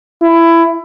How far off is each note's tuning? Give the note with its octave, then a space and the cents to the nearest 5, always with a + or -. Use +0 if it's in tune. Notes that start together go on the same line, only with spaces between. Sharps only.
E4 +20